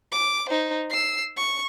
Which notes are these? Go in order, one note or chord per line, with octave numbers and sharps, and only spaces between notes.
D6
D#4 C5
E6 C7
C#6